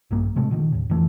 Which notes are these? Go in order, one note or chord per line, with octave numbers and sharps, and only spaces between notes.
A#1 G2 A#3
A2 C3 G#3 A3
A#2 D3 D#3
D#2 A2
F2 D3 E3 A3